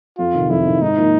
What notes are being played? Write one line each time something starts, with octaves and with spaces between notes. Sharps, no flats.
F2 F4
C3 D#3
F2 E4
C3 D#3
G#2 D#4
F3 A#3